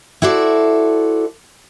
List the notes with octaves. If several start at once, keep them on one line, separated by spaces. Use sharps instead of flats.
E4 F#4 A4 C5 D5